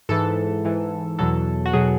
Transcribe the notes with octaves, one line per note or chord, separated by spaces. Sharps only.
G#2 E3 A4
G#2 E3
E2 B2 F#3 A4
F#4
B2 F#3 G#4